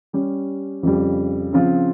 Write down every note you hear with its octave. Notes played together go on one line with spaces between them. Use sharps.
G3 C#4 G4
F2 C#3 G3
C#3 F3 C4 F4